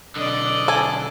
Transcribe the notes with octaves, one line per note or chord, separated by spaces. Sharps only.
B1 D3 D5 D#5
A4 G#5